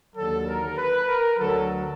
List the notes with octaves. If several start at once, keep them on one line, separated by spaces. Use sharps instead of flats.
D#2 D3 F#3 A4
A#4
B4
A#4
D2 D3 F#3 A4